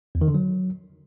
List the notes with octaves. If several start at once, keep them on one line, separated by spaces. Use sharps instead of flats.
E2
D#3
D3
F#3